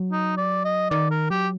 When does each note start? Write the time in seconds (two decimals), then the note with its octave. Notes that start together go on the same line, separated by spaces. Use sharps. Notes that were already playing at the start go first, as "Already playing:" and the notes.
Already playing: F#3
0.12 D#4
0.37 D5
0.65 D#5
0.90 D#3 D5
1.10 A#4
1.30 F#3 G4